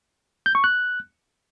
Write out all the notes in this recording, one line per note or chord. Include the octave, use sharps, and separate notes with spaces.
G6
C#6
F#6